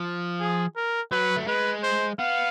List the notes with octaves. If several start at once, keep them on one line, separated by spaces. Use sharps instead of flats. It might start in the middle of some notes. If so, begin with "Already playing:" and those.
Already playing: F3
G#4
A#4
F#3 B4
A3
G#3 B4
C5
B3 F5